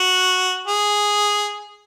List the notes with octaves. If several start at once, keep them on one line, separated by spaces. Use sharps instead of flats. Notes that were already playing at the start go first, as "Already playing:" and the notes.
Already playing: F#4
G#4